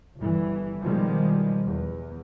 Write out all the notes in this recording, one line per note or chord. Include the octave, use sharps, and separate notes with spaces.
G1 E3
B2 D#3 F3 G3 G#3
E2